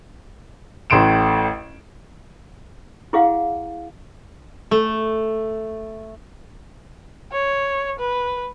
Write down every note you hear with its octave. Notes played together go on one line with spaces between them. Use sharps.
A1 A2 C6 D7 E7
E4 G#4 F5 F#5
A3
C#5
B4